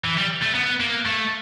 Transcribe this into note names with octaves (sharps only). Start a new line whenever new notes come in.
E3
G3
A3
B3
A#3
A3